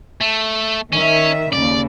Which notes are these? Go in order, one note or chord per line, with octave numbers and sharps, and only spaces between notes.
A3
D#3 C#4 E5
D#2 C#3 D5